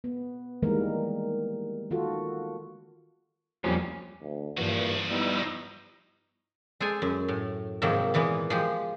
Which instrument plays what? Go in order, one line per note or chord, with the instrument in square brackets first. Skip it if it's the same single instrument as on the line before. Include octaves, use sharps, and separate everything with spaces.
[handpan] B3
D#3 E3 G3 G#3 A#3 A#4
D#3 F4 F#4 A4
[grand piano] F2 F3 G3 [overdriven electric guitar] A#2 C#4
[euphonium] D2
[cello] G2 [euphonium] A#2 [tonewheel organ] E3 [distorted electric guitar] F3 F#4
[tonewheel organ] G3 E4 E6 [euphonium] B3 [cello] D#4
[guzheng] G#3 A4 C5 D5 G#5
F#2
A2
G#2 C3 D#3 F3 F#3 A#3
A#2 E3 G#3 A#3 B3
F3 G#3 G4